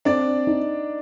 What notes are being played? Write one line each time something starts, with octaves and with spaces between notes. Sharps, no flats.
C4 D4 D5
D#4